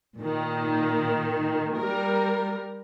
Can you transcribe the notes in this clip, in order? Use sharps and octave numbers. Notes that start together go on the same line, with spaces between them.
A#2 D#3
G3 A#4